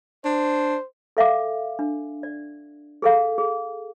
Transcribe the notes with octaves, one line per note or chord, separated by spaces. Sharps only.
D4 C5
A4 E5 F5 D6
D4
D5
G#4 A4 F5
G#4